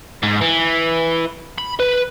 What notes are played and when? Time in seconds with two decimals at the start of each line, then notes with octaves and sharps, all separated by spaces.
0.23 G#2
0.41 E3
1.58 B5
1.80 B4